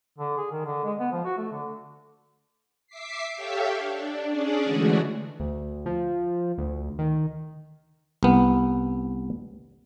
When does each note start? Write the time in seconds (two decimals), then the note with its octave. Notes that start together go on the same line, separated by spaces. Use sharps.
0.18 D3
0.37 G#4
0.51 D#3
0.66 D3
0.84 G#3
1.00 B3
1.12 F3
1.24 F#4
1.37 A3
1.52 D3
2.87 E5 D6 B6 C7
3.34 G4 A4 C#5 E5 F5 G5
3.78 D4
4.30 C#4 D4 G#4 D5
4.65 D3 E3 G#3 A3 F#4 G#4
5.40 D2
5.86 F3
6.58 D2
6.99 D#3
8.23 C2 B3